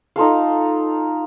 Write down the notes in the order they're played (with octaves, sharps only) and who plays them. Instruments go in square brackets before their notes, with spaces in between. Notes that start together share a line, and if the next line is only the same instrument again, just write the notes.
[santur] D#4 F4 A4 F5